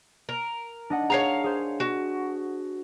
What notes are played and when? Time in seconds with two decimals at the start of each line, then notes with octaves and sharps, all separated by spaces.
0.29 A#4
0.90 D4 D#5 F#5
1.10 G#4 C#5 F5 A#5
1.44 G#4 C5
1.80 F#4